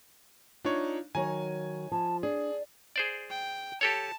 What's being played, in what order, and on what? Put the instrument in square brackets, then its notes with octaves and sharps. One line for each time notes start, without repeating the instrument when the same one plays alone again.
[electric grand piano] D4 D#4 C#5 [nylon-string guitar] F4
[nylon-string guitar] D#3 F#3 C#5 [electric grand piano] G#5 A#5
[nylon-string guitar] F3 [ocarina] A5
[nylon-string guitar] D4 [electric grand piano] G#4 [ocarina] D5
[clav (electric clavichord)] G#4 C5 D5
[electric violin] G5
[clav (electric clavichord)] G4 A4 C#5 [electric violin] A5